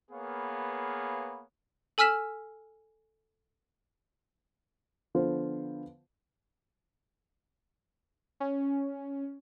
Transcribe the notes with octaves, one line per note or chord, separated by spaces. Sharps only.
A#3 B3 G#4 B4 C#5 F5
A4 G#5 E6 F6 B6 E7
D3 F3 B3 F4 C5
C#4